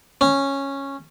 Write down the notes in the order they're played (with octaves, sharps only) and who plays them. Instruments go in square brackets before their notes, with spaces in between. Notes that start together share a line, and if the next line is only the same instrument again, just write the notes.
[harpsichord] C#4